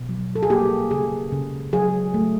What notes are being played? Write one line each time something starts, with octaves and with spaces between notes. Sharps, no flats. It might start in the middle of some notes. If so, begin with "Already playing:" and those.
Already playing: B2
F#3
A4
G#4
A#3 G4
C#3 G#4
C#3
F#3 G#4
A3